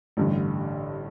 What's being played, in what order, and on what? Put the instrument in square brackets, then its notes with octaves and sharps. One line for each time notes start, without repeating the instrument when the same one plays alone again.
[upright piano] A1 G2 D3